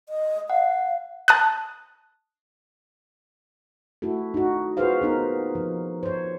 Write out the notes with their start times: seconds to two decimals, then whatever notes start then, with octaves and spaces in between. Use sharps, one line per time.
0.09 D#5
0.50 F5 F#5
1.28 A5 D#6 F#6
4.02 A3 E4 F#4 A4
4.34 D#4 F#4
4.77 F4 F#4 G#4 B4 C5 F5
5.01 B3 D#4 A#4
5.55 F3
6.03 C5 C#5